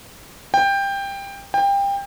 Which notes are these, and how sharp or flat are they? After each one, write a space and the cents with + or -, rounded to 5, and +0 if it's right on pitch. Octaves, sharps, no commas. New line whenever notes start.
G5 +15
G5 +25